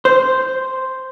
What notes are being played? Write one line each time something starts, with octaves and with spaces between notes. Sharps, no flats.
C5